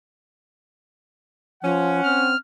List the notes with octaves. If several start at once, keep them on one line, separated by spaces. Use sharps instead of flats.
F3 C#4 F#5
C4 F6